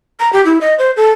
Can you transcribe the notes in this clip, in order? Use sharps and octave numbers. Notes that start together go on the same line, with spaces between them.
A#5
G4
E4
D#5
C5
A4